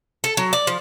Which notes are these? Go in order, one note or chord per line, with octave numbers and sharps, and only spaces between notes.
A4
F#3
D5
F3